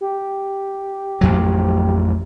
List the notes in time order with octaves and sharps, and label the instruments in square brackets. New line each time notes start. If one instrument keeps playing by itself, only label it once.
[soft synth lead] G4
[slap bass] A1 F2 F#3